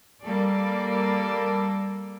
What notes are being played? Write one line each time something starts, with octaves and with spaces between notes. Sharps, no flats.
G3 A#3 A4 D5